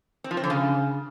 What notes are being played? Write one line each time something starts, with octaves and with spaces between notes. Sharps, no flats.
C4
F3
C4
D3
C#3